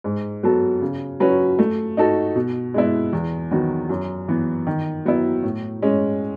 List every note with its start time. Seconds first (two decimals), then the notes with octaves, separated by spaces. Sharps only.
0.04 G#2
0.43 F#3 B3 F#4 A4
0.81 C#3
1.20 F#3 C#4 F#4 B4
1.59 A3
1.97 D#4 F#4 A4
2.35 B2
2.74 G#3 B3 E4
3.13 E2
3.51 D#3 F#3 B3 F#4
3.89 F#2
4.28 E3 B3
4.67 D#3
5.05 F#3 B3 E4
5.43 A2
5.82 G#3 C#4